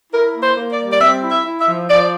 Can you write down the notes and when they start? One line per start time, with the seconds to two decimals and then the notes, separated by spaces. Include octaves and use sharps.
0.11 E4 A#4
0.34 A#3
0.42 C5
0.56 A#3
0.71 D5
0.78 G3
0.90 D5
1.00 C4 E5
1.22 E4
1.30 E5
1.44 E4
1.60 E5
1.67 F3
1.89 F3 D5